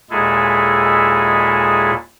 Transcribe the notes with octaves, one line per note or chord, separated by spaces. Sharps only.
D#2 A#2 G#3 E4 G#4 A4